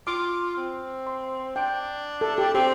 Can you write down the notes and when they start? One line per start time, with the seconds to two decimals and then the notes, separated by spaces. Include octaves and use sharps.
0.07 F4 D6
0.57 C4
1.07 C6
1.56 D4 G5
2.21 A4
2.38 G4
2.54 C4 G4